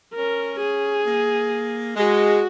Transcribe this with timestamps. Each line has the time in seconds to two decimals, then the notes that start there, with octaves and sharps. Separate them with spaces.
0.14 C#4 A#4
0.60 G#4
1.05 A#3
1.96 G#3 F#4